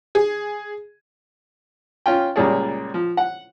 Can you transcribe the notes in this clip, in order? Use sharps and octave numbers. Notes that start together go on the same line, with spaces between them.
G#4
C#4 F4 G5
C#2 A#2 G3 G#4 C#5 D5
F3
F#5